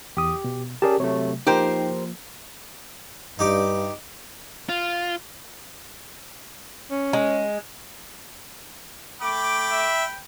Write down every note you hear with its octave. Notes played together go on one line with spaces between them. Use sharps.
E2 G4 D#6
B2
C#4 G4 G#4 A#4 D5 A5
C3 F#3 A3 C#5
F3 A#3 D#4 G4 A#4 C5 G5
G2 D#4 G4 D6
F4
C#4
G#3
A3 G5 B5 D6
E5